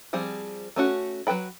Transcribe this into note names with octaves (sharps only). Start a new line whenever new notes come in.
F3 G3 C4 G#4
A3 C#4 F#4
F#3 C4 B4 G5 B5